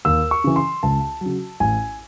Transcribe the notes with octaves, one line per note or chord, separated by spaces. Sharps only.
D#2 E6
C#6
C#3 E3
C6
C#2 A5
C#3 F#3
A1 G#5